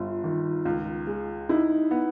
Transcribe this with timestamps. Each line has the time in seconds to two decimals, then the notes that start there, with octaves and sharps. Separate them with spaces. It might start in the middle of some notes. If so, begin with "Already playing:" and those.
Already playing: G1 F4
0.24 D#3
0.65 C#2
1.07 G#3
1.49 D#4 E4
1.91 B3